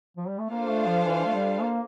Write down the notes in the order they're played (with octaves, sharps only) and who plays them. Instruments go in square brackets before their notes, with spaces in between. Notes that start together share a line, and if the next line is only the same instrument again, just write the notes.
[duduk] F3
G3
A3
[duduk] A#3 [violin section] D4 F4 A4 C5 F5
[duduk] A3
F3
E3
A3
G3
A#3